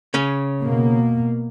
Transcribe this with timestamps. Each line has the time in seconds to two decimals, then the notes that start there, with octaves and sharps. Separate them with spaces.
0.14 C#3 C#4
0.61 B2 A#3